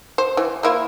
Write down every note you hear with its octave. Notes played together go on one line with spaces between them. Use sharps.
C5
E3
A#3 E4 F4